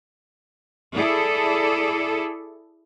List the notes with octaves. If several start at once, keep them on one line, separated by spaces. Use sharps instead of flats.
E4 G#4 A4 D5